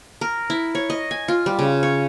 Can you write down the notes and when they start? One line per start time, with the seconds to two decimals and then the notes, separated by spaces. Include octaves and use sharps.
0.21 A#4
0.50 E4
0.75 C#5
0.90 D#5
1.11 G#5
1.28 F4
1.46 G3
1.59 C#3
1.83 C#5